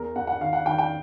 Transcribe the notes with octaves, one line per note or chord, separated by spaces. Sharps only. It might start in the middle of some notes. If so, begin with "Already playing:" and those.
Already playing: E2 A#4
E2 F#5
F#5
D#3 F5
F#5
D#3 G5
G5